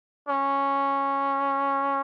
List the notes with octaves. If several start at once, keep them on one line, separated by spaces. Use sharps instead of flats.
C#4